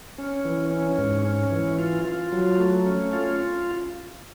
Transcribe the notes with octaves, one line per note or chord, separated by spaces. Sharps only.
C#4
E3
C#4
G#2
C#4
E3
F4
F4
F#3
A3
C#4
F4